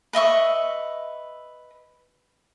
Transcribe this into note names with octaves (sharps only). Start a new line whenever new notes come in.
B4 D#5 E5 C#6